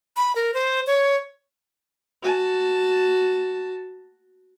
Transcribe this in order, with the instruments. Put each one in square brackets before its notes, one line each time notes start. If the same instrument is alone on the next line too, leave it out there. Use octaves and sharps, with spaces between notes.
[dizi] B5
A#4
C5
C#5
[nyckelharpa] F#4 A5